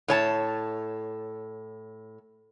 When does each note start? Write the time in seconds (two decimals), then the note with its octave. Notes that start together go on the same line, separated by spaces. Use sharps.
0.08 A2 C#5 A5